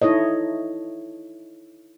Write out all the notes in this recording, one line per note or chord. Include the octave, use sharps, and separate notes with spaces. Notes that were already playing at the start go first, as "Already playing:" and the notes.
D#4 E4 A4 C#5 D#5